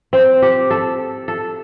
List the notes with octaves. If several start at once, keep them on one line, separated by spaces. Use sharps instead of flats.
C4
G4
A4
A4